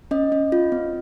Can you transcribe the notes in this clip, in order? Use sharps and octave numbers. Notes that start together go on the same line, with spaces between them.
C#4 D#5
C#4
F4
C4